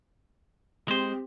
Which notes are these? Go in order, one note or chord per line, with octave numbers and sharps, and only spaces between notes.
G#3 C4 G4 C5